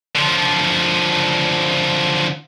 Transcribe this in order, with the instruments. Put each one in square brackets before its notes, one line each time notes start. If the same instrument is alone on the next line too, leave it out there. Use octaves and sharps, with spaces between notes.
[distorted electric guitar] D3 F3